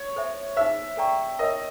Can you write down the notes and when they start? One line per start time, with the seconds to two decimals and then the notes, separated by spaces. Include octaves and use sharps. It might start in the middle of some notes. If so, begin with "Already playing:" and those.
Already playing: C#5
0.16 A4 C5 E5
0.56 D#4 G#4 C5 E5
0.97 A4 D5 G5 A#5 C#6
1.39 A#4 C#5 D#5 E5